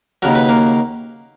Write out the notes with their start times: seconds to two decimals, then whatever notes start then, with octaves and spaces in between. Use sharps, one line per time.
0.22 D#2 C#3 F#3 A#4
0.35 B4
0.49 A#3 A#4